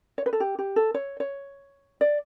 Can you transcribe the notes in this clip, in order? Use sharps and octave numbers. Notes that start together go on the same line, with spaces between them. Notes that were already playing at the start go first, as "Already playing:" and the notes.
C#5
B4
A4
G4
G4
A4
C#5
C#5
D5